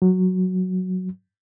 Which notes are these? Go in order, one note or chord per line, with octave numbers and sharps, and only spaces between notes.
F#3